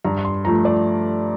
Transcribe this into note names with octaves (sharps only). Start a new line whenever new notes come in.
G2 A#5
C6
F3 A3 A#5
D5